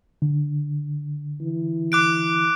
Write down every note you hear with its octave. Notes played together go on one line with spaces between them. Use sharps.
D3
E3
D6 F#6 D7